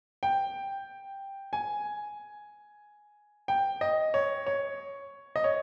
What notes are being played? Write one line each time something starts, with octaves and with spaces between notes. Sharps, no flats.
G5
G#5
G5
D#5
C#5
C#5
D#5
C#5